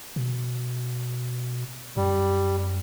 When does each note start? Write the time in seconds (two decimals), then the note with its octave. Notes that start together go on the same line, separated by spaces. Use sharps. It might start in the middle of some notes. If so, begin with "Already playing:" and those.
0.16 B2
1.97 F#2 G3